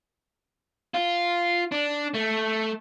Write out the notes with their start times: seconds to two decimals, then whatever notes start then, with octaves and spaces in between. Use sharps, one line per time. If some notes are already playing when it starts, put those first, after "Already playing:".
0.94 F4
1.72 D4
2.14 A3